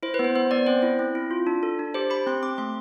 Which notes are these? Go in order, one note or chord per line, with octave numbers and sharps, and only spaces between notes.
E4 C5
B4
B3
C5
B3 C5
B3 D5
C4 C5
E4
C4
E4
F4
D4
A4
D4
G4 C5
G4 B5
C4 C6
C4 D6
A3 C6